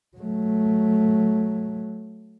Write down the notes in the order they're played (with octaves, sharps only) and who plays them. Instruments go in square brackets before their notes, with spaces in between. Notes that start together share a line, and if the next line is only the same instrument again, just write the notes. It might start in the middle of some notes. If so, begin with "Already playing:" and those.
[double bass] F#3 A3